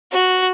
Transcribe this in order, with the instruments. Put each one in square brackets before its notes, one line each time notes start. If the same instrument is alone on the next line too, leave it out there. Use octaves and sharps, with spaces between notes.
[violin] F#4